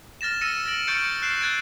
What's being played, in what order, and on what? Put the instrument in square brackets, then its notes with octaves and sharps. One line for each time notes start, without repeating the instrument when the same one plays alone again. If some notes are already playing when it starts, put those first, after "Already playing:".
[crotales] F6 A6 A#6 E7
E6 A6 A#6 C#7 D#7 E7
A6 A#6 D7 F#7
C#6 F6 G6 A6 C#7 D7
F6 F#6 C7 D7 E7
F#6 G#6 A6 D7